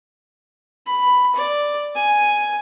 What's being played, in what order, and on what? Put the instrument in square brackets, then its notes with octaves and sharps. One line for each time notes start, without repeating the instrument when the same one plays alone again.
[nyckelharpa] B5
D5
G#5